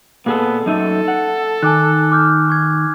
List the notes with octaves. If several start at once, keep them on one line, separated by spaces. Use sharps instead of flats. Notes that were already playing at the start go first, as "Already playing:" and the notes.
A#2 B3 G#4 A4
F#2 D#4 A4 E5
F#5
D#3 G#5 D6 F#6
D6 F6 G6
C#6 G#6